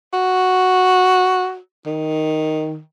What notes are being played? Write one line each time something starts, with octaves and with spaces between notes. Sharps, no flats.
F#4
D#3